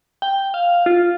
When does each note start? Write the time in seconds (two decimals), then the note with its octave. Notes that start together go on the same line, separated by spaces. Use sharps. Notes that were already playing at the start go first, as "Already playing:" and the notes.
0.22 G5
0.54 F5
0.86 F4